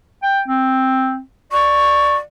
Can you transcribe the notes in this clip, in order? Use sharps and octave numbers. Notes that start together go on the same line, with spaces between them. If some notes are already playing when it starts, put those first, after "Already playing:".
G5
C4
D5 C#6